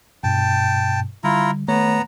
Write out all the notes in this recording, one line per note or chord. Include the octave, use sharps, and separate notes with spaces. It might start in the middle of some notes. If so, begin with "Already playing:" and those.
G2 B2 G5 A5
D3 G3 E4 F4 A#5
D#3 A3 B3 C#5 A#5